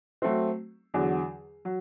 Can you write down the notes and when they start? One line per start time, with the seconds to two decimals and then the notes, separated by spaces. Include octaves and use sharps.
0.22 F#3 A3 C4
0.94 E2 D3 F#3
1.65 F#3